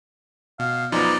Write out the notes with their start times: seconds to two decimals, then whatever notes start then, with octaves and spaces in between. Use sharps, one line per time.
0.59 B2 F5
0.92 F#2 F3 B3 D#4 D5